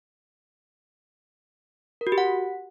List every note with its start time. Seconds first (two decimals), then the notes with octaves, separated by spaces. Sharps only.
2.01 A#4
2.07 F#4
2.12 G4
2.18 F#5